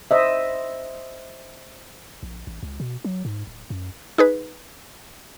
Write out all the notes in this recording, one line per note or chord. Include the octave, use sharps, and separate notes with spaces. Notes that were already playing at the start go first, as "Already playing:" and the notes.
C5 D#5 E5
A#1
A1
C#2
B2
F#3
G#2
D1
F#2
D#4 G#4 B4